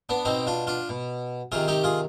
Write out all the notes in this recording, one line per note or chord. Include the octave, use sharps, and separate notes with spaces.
B3 D4
B2 C4 D#4
D4 F4
D4 F4
B2
C3 D#3 F4 G#4
D#4 G4
F4 G#4